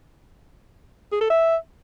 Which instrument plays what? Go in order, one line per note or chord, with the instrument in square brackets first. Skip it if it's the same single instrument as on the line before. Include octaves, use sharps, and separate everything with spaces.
[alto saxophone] G#4
A4
E5